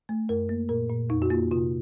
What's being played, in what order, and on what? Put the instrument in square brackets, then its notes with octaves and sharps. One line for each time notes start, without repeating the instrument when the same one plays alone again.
[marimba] A3
F#2 A#4
A#3
A#2 A#4
A#2
F2 D#4
F#4
A#3 F4
C3 F4